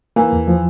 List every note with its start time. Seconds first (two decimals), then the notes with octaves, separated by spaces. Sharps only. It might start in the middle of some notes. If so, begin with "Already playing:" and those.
0.16 E3 A#3
0.32 E2
0.47 F3